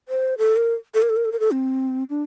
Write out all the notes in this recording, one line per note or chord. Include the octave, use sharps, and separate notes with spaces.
C5
A4
A#4
A4
A#4
A4
A#4
A4
A#4
A4
C4
D4